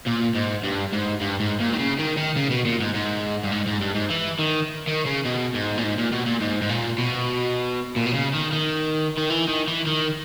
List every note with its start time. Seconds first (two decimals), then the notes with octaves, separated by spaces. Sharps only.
0.06 A#2
0.35 G#2
0.64 G2
0.93 G#2
1.21 G2
1.40 G#2
1.60 A#2
1.73 D#3
1.79 C#3
1.99 D#3
2.17 D#3
2.36 C#3
2.50 B2
2.65 A#2
2.80 G#2
2.94 G#2
3.43 G2
3.52 G#2
3.67 G#2
3.81 G2
3.95 G#2
4.10 E3
4.39 D#3
4.87 D#3
5.06 C#3
5.25 B2
5.54 G#2
5.78 A#2
5.83 G#2
5.98 A#2
6.12 B2
6.26 A#2
6.41 G#2
6.62 G#2
6.69 A#2
6.98 B2
7.96 A#2
8.06 B2
8.14 C#3
8.34 D#3
8.52 D#3
9.18 D#3
9.30 E3
9.48 D#3
9.68 E3
9.87 D#3